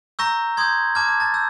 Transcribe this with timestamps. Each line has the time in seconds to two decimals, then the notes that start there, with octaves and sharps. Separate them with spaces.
0.19 A#5 C#6 E6 G6 A#6
0.57 C6 D#6 G6 G#6
0.95 A5 D6 F6 G#6
1.09 G#6
1.20 A5 A6
1.34 E6 G6